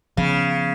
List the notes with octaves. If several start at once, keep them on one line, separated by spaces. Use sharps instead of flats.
C#3 F3 B3